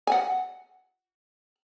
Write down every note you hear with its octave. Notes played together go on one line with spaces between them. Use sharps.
F#5 G#5